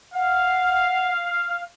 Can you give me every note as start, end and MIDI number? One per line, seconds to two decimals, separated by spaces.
0.14 1.63 77
0.14 1.12 78